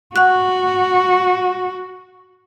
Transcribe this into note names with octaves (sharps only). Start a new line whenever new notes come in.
F#4 F#5 C#6 F#6